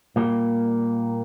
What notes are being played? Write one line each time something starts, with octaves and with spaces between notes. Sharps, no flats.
A#2 G3 A#3